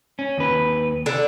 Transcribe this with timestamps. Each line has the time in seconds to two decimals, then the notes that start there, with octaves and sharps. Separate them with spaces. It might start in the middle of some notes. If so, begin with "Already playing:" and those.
0.19 C#4
0.37 D#2 B4
1.06 D3